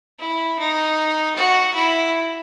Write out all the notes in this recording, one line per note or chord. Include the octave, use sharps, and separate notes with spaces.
E4
D#4
F#4
E4